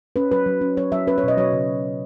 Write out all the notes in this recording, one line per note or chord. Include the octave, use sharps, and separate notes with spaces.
C#4 B4
F#3 B4
F#3
C#4
F#3 C#5
F#3 E5
C#4 B4
C#5
B2 D#5
F#3 C#5
C#3